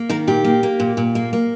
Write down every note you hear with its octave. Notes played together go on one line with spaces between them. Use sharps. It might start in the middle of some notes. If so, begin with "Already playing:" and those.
Already playing: A#3
D#3 A#4
A#2 G4
A#3
A#3
A#2
A#2
A#3
A#3